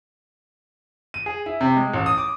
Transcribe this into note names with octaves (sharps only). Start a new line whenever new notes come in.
D#7
G#4
E4
C3
G#3
A1
D#6
D6